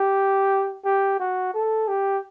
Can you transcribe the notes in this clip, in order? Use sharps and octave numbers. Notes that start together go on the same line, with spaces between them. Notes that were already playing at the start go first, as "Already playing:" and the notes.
Already playing: G4
G4
F#4
A4
G4